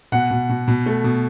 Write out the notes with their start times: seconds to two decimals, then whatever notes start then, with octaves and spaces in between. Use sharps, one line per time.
0.12 B2 F#5
0.31 B2
0.50 B2
0.68 B2
0.86 A3
1.04 B2